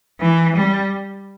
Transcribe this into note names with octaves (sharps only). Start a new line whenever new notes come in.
E3
G3